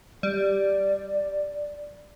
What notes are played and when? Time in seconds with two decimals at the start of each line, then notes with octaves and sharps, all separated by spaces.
0.23 G3 D5